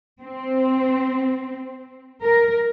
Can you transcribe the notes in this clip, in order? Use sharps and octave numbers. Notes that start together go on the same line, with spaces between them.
C4
A#4